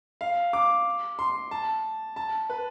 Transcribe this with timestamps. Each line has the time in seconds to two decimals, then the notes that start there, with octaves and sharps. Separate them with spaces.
0.21 F5
0.53 D6
1.19 C6
1.51 A5
2.16 A5
2.49 B4